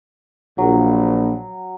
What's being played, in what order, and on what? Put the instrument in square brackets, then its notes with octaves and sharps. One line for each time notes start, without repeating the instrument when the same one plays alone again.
[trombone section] A#1 [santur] F#3